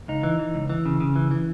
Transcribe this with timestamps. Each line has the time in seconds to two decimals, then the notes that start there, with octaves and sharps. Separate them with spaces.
0.08 C#2 D#4
0.23 E3
0.39 E3
0.55 C#2
0.70 E3
0.85 C#3
1.00 C#3
1.16 E3
1.31 E3